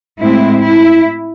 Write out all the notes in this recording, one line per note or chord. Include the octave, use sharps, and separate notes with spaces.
A2 G#3 C4 E4
E4